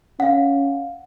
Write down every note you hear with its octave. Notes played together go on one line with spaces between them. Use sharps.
C#4 F5 F#5